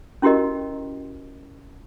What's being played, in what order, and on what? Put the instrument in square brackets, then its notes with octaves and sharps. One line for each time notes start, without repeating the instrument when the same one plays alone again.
[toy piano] C#4 E4 F#4 G4 A#4 D#5